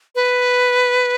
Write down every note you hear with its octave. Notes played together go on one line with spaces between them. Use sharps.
B4